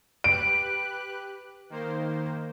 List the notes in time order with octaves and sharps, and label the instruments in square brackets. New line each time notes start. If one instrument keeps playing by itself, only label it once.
[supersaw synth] G4 B4 F#6 [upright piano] D7
[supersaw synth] D#3 A#3 C5